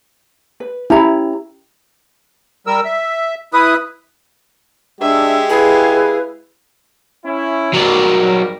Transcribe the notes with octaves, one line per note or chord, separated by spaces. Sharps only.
B4
C#4 E4 G4 A#5
G3 A#4 E6
E5
E4 B4 D#6
G#3 D4 G4 E5
E4 G#4 B4 F5
C#4 E4
G#1 F#3 G3 A#4 D5